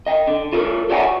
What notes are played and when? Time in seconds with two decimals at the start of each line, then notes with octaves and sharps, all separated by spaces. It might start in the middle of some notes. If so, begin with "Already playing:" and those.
0.06 D#5 G5
0.27 D3
0.53 F4 A4 A#4
0.90 G4 C#5 D5 E5 F#5 G#5
1.02 F#4